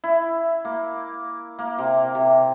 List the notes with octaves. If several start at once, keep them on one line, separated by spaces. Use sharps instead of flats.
E4
A#3
A#3
C3
C3